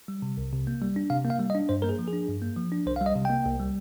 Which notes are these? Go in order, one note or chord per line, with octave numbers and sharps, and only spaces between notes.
G3
C3
C2
C3
A#3
G3
D4
C3 F5
A#3
F5
G3
D#5
D4
G2 C5
A#3 A#4
G#4
F3
G#4
D4
G2
A#3
F3
D4
C2 C5
F5
G3
D#5
C3
A#3 G5
C2
G3